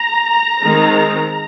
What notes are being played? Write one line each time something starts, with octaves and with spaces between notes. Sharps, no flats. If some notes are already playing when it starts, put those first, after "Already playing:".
Already playing: A#5
D#3 G#3 C4